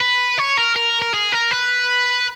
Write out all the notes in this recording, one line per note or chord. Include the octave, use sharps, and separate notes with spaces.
B4
C#5
A#4
A#4
A#4
G#4
A#4
B4